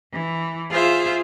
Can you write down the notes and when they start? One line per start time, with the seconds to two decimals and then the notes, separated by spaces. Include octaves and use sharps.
0.13 E3
0.71 F4 G#4 C5 E5 F5